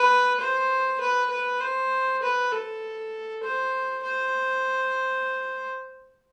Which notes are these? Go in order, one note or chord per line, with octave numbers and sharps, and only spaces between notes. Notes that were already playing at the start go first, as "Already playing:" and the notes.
Already playing: B4
C5
B4
B4
C5
B4
A4
C5
C5